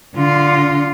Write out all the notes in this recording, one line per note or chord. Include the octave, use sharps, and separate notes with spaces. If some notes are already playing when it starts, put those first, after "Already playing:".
D3 F4